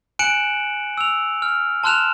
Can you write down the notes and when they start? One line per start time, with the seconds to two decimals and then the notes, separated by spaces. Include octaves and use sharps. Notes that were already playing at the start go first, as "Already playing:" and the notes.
0.19 G#5 F#6 C#7 D7 E7 F#7
0.98 E6 F7
1.42 F6
1.84 A5 C6 F6 F#6 E7 F7